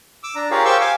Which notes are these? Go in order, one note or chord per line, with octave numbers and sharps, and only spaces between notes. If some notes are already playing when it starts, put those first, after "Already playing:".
D6 E6
D4 A#5
F4 G4 G#4 A#4 C#5 F5
G4 C5 F5 G5 C#6 E6
F5 G#5 D6